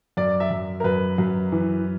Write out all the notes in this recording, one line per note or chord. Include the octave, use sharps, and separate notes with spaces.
F#2 D5
E5
F#2
A#4
F#2 B4
F#2
E3